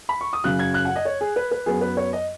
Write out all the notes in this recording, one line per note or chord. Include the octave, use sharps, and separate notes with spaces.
B5
C#6
D#6
F#2 C#3 F#3 F#6
G#6
F#6
F#5
D#5
C#5
G#4
B4
B4
F#2 F#3 B3 G#4
B4
C#5
D#5